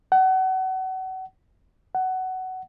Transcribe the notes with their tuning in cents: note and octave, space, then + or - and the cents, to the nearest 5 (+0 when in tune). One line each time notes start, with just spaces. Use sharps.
F#5 +30
F#5 +15